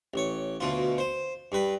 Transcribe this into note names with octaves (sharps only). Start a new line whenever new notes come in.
A1 C#5
D2 B2 F4
C5
G2 B4